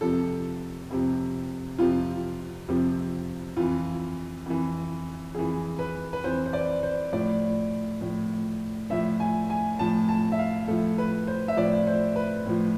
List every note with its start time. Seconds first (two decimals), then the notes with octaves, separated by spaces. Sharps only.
0.01 F2 C3 F3 A4
0.90 F2 C3 F3
1.78 F2 C3 F3 F4
2.68 F2 C3 F3
3.57 F2 E3 F4
4.46 F2 E3
5.35 F2 E3 G#4
5.79 B4
6.13 B4
6.24 F2 E3 C5
6.46 C5
6.53 D5
6.83 C5
7.13 A2 F3 D5
8.01 A2 F3
8.90 A2 F3 E5
9.20 G#5
9.50 G#5
9.79 A2 F3 A5
10.09 A5
10.32 E5
10.39 F5
10.68 A2 F3 A4
10.98 B4
11.27 C5
11.48 E5
11.57 A2 F3 D5
11.87 C5
12.16 B4
12.46 A2 F3